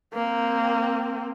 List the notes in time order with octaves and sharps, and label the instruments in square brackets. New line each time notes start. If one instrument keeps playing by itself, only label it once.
[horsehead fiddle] A#3 C4